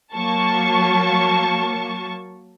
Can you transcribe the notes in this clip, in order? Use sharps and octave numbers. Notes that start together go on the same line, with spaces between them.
F#3 A#3 A5 C#6